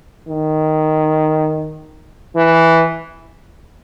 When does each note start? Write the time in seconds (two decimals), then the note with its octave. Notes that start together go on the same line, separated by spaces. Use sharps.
0.28 D#3
2.36 E3